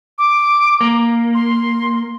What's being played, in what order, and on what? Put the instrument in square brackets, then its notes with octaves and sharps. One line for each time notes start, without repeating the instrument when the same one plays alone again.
[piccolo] D6
[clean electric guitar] A#3
[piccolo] C6